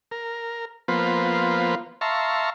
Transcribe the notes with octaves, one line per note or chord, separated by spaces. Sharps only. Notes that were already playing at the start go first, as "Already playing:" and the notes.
A#4
F3 A#3 B3 F4 B4 C5
E5 F5 A5 A#5 C6 C#6